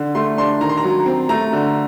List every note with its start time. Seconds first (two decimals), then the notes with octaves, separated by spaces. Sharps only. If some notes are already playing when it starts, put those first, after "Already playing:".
Already playing: D3
0.15 A3 C6
0.38 D4 C6
0.61 D#3 A#5
0.69 C6
0.77 A#5
0.84 F#3
1.06 C4
1.29 A3 A#5
1.53 D3